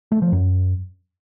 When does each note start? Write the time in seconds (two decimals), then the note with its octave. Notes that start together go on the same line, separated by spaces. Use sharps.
0.12 A3
0.22 F3
0.32 F#2